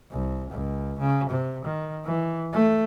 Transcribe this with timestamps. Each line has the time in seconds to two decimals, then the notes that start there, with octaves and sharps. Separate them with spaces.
0.11 C2
0.51 C#2
0.99 C#3
1.30 C3
1.65 D#3
2.05 E3
2.53 A3